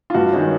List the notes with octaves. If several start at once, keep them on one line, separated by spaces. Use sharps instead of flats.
F4
G2 F#4
D#3 G#3 C#4